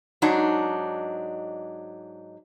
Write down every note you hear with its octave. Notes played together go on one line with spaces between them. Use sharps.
G#2 F#3 D4 D#4